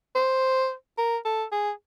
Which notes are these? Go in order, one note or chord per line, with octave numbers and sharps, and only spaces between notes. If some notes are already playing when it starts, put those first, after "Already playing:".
C5
A#4
A4
G#4